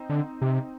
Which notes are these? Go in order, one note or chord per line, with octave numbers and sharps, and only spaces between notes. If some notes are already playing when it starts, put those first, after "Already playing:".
Already playing: C4 D#4
D3
C3